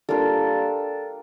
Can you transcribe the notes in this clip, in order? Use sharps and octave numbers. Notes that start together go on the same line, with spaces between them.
G3 A#3 D4 F4 A4